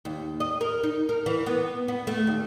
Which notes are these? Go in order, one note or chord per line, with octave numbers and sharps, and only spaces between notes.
D#2
D#5
A#4
D#4
A#4
E3
B3
B3
A3
D#2